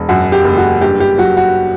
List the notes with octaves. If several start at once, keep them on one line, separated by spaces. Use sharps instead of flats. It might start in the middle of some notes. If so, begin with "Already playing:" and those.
Already playing: E1
F#2 F#4
G4
F#1
F#4
G2 G4
G4
F#3 F#4
F#4